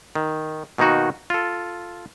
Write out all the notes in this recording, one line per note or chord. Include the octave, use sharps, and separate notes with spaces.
D#3
B2 D#3 A#3 D#4 F#4
F4 A4